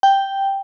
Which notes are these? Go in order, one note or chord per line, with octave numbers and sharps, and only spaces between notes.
G5